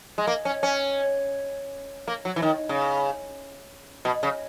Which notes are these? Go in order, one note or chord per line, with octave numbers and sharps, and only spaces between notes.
G#3
A#3
C#4
C#4
A#3
F#3
E3
D#3
C#3
B2
C#3